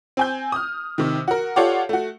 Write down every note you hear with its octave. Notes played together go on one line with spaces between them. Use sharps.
C4 G#5 G6
D#6 F6
C3 D#3
F#4 A#4
F4 G4 A4 C#5 D5 F#5
A3 F#4